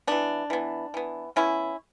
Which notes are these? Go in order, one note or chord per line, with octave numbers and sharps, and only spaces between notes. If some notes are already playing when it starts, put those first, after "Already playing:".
E3 B3 D4
E3 B3
E3 B3
E3 B3 C#4 E4